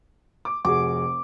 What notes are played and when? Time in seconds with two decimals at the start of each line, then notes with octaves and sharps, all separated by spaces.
0.45 D6
0.65 F1 F#4 G#4 D6